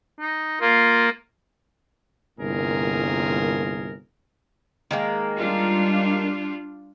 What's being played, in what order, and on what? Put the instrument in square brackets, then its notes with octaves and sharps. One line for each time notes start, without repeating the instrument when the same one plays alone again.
[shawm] D#4
[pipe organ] A#3 [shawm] F4
[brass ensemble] G1 C2 A#2 G#4 A#4
[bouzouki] D#3 G#3 A#3
[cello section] G3 D4 F4